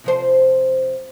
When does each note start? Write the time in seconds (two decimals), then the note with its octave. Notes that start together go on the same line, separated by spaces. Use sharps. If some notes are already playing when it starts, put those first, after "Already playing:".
0.04 C3 F3 C5